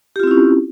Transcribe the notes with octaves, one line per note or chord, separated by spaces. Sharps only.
C4 C#4 E4 F4 G4